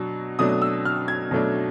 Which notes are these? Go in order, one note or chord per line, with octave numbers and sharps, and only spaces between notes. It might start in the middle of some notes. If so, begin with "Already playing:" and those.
Already playing: B2 F#3 D4
B2 F#3 A3 D4 D#6
E6
F6
G#6
B2 F#3 A3 D4